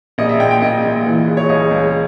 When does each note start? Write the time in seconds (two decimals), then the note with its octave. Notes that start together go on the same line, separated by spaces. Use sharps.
0.18 A#1 D#5
0.29 E5
0.40 A#2 G5
0.51 G5
0.62 A#1 D#5
0.84 A#2
1.06 E3
1.27 C#3
1.37 C#5
1.49 C#2 D#5
1.71 C#2